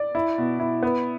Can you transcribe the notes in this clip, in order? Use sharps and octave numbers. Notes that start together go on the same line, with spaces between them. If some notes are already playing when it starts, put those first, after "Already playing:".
Already playing: D5
E4
B2
E4
B3